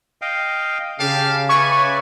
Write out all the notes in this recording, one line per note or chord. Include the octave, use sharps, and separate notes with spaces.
D#5 F5 G5
C#3 G4 F5 G5 A5
B4 D5 E5 G#5 C#6